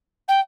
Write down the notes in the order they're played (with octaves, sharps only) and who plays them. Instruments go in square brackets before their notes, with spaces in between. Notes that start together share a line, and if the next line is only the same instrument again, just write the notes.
[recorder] G5